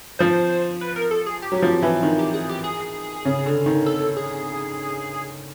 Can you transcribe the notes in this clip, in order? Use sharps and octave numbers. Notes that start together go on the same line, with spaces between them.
F3 C5
B4
A#4
A4
G#4
G4
F#3
F3
E3
D#3
G4
G#4
G4
G#4
C#3
D3
D#3
A4
G#4